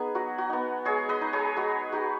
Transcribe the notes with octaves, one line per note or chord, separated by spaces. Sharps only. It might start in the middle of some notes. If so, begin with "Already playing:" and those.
Already playing: B3 D#4 G#4 B4
F#3 F#4
F#4
B3 D#4
G#3 G#4 C#5
B4 D#5
D#4
G#4 C#5
G#3 F#4 B4
D#4 F#4